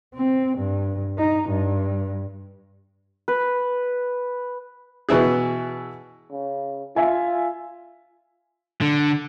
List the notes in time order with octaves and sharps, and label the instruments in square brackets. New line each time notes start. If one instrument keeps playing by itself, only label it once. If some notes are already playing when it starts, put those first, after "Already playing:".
[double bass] C4
G2
D#4
G2
[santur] B4
[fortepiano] B2 E3 E4 G#4
[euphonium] C#3
[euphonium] F4 [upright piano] E5 G#5
[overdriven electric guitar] D3